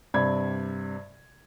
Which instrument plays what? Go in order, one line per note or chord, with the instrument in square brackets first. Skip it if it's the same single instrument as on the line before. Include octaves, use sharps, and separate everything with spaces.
[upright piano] G2 C3 D5 B5 G#6